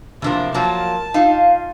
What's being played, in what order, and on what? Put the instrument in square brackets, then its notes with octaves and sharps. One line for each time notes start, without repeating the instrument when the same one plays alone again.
[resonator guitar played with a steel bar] E2 F3 A#3 [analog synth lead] C3 [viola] D4
[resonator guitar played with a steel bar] F3 F#3 A#3 [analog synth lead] A#4 [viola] A5
[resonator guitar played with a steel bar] D#4 F4 [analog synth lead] F5